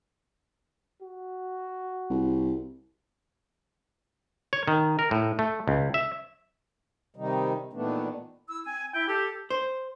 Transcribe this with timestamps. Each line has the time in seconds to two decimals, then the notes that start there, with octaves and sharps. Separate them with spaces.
1.02 F#4
2.10 C2
4.53 C#5
4.68 D#3
4.99 A#4
5.11 A2
5.39 A3
5.68 C#2
5.94 E5
7.16 C3 D#3 G3 D#4
7.73 A#2 D#3 E3 A3 B3 D4
8.49 E4 E6
8.65 C4 G#5
8.94 E4 G5
9.08 G4 A4
9.50 C5